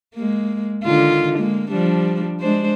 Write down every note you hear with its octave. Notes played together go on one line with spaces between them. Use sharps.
G#3 A#3
D3 D#3 F4
G#3 A#3
F3 G3 D4
G#3 D4 C5